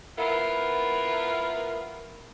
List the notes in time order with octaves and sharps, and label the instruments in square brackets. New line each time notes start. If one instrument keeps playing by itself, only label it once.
[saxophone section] B3 E4 F4 A#4